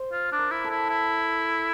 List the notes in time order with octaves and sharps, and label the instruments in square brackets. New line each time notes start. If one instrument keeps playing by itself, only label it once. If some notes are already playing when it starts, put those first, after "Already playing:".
Already playing: [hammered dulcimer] C5
[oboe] F4
D4
[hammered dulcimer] A#4
[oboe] E4
[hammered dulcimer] A4
[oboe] E4
E4